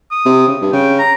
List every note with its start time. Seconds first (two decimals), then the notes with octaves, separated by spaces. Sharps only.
0.11 D#6
0.25 C3
0.48 C#3
0.61 G2
0.73 C#3 G5
0.99 A#5